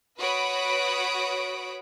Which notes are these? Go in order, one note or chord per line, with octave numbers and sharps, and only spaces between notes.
F#4 B4 C#5 B5 D#6 D7